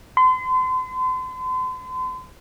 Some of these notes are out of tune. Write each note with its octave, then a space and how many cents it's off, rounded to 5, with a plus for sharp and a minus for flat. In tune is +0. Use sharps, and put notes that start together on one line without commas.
C6 -40